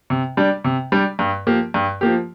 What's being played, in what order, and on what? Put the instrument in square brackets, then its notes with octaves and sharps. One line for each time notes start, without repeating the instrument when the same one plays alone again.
[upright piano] C3
G3 D4
C3
G3 D4
G2
F3 A#3 G4
G2
F3 A#3 G4